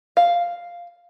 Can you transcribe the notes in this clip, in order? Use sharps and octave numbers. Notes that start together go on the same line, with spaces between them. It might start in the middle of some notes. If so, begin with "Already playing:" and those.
F5